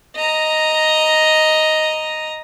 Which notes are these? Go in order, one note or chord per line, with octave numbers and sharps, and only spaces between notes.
D#5 A#5